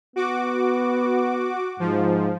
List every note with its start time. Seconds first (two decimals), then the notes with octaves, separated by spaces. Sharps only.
0.16 B3 F#4 D6
1.80 G#2 F3